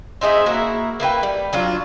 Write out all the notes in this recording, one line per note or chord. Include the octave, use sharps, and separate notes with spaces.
C4 D#4 G#4 E5
A#3 E4 F#4 A#5
A#3 E4 B4 G5
G3
F#3 D4 F4